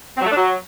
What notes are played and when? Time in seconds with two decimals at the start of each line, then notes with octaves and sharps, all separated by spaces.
0.16 C4
0.21 F#3
0.26 A3
0.31 D4
0.37 F#3